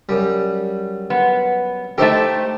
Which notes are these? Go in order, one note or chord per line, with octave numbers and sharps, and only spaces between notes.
F#2 G3
B3
A3 D#4 E4 G4 A4 C5